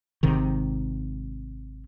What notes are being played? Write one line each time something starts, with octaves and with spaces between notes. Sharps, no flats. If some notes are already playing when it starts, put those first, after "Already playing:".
G#1 G#2 C3 D#3